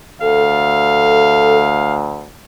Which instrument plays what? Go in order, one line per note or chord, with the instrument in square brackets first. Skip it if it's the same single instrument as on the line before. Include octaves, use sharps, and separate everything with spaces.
[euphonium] D2 [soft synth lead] A4 [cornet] F5